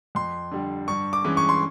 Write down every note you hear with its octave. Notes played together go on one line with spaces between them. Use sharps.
F2 C6
D3 G3
G2 C#6
D6
E3 G#3 C#4
C#6
C6